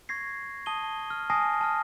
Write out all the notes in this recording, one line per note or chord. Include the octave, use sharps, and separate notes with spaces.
C#6 G#6 A#6 C7
A5 D#6 D#7 G7
F6
G#5 A5 D#6 A#6 C7
A5 F6